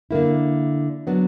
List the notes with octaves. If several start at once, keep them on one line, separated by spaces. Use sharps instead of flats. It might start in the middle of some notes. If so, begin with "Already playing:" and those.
D3 A#3 E4
F#3 B3 D4